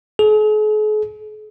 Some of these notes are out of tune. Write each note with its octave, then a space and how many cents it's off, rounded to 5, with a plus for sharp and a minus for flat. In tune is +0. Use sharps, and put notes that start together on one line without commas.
G#4 +45